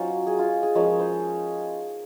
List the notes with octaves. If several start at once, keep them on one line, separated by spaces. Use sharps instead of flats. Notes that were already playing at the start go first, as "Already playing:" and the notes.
Already playing: F#3 C#4 D#4 F4 C5 D#5
G#4
F4
G#4
F3 G#3 C#4 A#4
C5